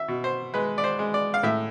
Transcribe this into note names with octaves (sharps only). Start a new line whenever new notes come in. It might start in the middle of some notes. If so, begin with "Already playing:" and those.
Already playing: E5
B2
C5
G#3 B4
D5
C5
G#3
D5
F5
A2 E5